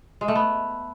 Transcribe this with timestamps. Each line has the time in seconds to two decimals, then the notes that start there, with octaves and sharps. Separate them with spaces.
0.21 G#3
0.28 A3
0.35 B3